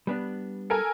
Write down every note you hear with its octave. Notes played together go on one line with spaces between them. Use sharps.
G3 B3 D4
A4 A#4 G#5